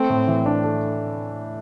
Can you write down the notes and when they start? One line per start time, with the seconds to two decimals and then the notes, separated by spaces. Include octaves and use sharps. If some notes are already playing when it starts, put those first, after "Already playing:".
Already playing: A3 C4
0.10 A2
0.28 E3
0.46 D4
0.64 A3